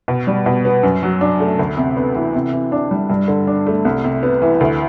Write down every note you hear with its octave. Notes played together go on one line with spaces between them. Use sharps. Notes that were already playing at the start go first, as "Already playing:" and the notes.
B2
G3
B2
B3
F#2
F#3
D4
A3
D2
C3
B3
E3
C3
E3
D4
G3
G2
D3
D4
A3
C2
C3
B3
E3
D2